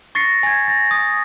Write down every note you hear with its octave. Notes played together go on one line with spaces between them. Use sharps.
C#6 A6 A#6 C7 C#7
G#5 G#6
A6 A#6
D#6